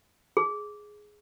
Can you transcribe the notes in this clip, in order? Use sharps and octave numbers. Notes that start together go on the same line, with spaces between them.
G#4